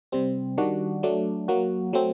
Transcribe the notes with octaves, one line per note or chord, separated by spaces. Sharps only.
C3 G3 C4
D#3 G3 D4 F#4
F#3 A3 D4
F#3 A#3 F#4
F#3 A3 C4